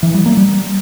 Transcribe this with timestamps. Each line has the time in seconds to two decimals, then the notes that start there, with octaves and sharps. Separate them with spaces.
0.03 E3
0.14 G3
0.26 A#3
0.37 G3